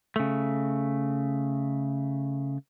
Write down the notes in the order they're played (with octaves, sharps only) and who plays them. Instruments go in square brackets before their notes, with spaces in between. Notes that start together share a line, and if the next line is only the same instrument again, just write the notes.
[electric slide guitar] C#3 A3